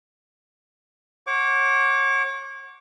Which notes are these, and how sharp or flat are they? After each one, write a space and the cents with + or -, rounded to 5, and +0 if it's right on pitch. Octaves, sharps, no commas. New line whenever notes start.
C#5 -30 F#5 +0 D6 -30